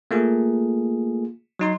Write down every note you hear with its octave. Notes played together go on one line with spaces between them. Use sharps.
A3 A#3 F4 G#4
F#3 D#4 C6